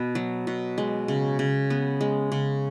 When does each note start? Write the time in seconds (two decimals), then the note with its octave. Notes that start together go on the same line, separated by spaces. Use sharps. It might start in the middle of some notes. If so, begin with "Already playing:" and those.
Already playing: B2 B3
0.15 F#3
0.47 B2
0.78 G#3
1.08 C#3
1.39 C#3
1.70 B3
2.01 G#3
2.32 C#3